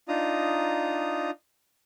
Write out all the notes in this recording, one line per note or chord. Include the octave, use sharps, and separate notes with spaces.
D4 D#4 F4 A#5 D#6